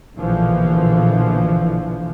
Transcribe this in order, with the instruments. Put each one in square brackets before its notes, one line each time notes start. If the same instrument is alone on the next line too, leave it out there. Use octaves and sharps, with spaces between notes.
[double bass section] A#1 B2 D3 E3 F3